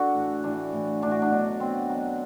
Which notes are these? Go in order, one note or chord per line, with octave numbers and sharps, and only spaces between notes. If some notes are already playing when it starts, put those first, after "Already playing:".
Already playing: D4 F#4 A4
A2 E3
A2 E3 D4
A2 E3
A2 E3 D4
F#4
D4
B2 F#3
B2 F#3 C4
B2 F#3